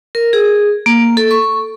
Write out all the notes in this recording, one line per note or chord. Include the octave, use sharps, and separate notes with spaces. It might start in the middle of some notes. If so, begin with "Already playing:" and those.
A#4
G#4
A#3
A4
C#6